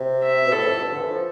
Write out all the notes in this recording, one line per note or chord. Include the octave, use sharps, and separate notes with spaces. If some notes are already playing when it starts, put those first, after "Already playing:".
Already playing: C3
E5
B2
A2 A4
F2
G2
D3
E3
F3